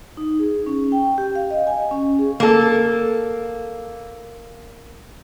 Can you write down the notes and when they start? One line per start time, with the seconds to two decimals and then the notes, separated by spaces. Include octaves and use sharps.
0.17 D#4
0.39 G#4
0.67 C#4
0.92 G5
1.18 G4
1.36 F5
1.50 D#5
1.67 G#5
1.91 C#4
2.19 G#4
2.40 A#3 A4